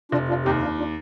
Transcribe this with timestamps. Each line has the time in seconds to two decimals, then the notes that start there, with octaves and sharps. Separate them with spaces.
0.12 F1 D4 F4
0.28 D4 F4
0.45 D#2 D#4 G4
0.61 D4 F4
0.78 D4 F4